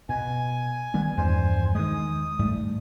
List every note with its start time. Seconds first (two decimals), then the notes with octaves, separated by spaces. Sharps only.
0.09 B2 G#5
0.94 D#3 G3 B3
1.17 E2 G2 G3 C5 G#5
1.75 D#3 G#3 D#6
2.39 G#2 G3 A3